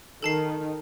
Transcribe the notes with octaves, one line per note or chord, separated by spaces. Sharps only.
D#3 A4 A5 C7